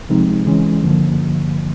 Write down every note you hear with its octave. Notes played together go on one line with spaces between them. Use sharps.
C3 F3 G#3 C4 D#4
C#3 E3 G#3 C#4
G2 D3 F3 A#3